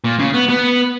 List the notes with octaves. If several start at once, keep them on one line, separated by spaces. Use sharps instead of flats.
A#2
C#3
B3
B3